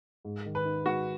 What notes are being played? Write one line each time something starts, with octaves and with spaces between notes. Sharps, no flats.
G#2
D#3
B4
D#4
G#3 F#4